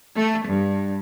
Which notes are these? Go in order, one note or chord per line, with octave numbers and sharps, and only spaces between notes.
A3
G2